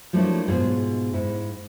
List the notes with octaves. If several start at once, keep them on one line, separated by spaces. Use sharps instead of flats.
F3 F#3 A3 A#3 D4 E4
G#2 B2 F4 G#4
G#2 E4